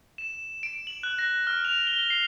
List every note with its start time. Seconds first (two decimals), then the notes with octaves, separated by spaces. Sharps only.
0.18 E7
0.63 D7
0.87 F#7
1.03 F#6
1.19 A#6
1.47 F6
1.65 F7
1.87 G7
2.10 C7